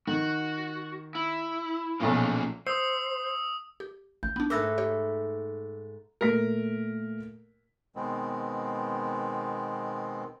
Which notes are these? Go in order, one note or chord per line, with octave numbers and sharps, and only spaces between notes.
D#3 F#4
E4
B1 A#2 F3 A#3 C#4 G#4
C5 D#6 E6
G4
A1 G6
B3 D4
G#2 A3 A#4 B4 D6 E6 G#6 A#6
G4 C#5
A#2 A3 A#4 B6
B2 D#3 G#3 B3 C4